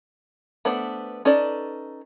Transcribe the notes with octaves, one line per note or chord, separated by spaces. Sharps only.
A3 B3 D4 C5
C#4 D#4 A4 B4 D5